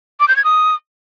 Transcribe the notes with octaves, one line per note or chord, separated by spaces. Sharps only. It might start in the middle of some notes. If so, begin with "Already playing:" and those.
D6
G6
G#6
D#6